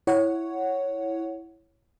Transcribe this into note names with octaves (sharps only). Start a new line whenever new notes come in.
E4 C#5 F#5